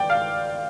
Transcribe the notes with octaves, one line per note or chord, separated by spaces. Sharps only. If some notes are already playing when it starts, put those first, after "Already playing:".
Already playing: D5 G5
F5